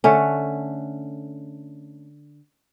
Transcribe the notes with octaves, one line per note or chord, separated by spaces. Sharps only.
D3 A3 C#4